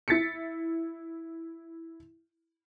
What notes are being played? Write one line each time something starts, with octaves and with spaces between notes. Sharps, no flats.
E4 A6 B6 C#7